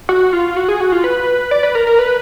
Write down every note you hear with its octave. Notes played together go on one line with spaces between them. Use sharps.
F#4
F4
F#4
G#4
F#4
F4
B4
D5
B4
A#4
A#4
B4